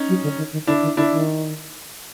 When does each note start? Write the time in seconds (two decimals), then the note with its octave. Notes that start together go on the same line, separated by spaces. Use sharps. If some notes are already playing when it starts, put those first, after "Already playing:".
Already playing: C#4 D#4
0.09 F#3
0.23 D3
0.38 D#3
0.53 D#3
0.67 D3 D4 E4
0.82 D#3
0.97 D3 D4 E4
1.12 D#3